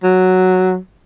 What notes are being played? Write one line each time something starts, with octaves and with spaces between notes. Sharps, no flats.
F#3